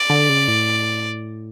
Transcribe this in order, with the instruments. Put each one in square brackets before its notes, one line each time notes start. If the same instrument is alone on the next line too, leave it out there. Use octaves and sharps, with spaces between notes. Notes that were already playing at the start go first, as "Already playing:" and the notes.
Already playing: [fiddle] D5
[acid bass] D3
C#3
A2